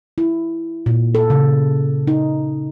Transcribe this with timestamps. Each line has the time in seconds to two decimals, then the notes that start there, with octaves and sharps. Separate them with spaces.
0.18 E4
0.86 A#2
1.15 A4
1.30 C#3
2.07 D#4